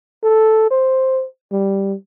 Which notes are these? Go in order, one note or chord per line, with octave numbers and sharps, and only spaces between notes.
A4
C5
G3